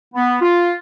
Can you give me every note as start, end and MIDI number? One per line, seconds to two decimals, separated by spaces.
0.14 0.36 59
0.41 0.74 65